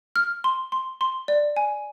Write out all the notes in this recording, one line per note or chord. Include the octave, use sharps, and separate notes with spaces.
F6
C6
C6
C6
D5
G#5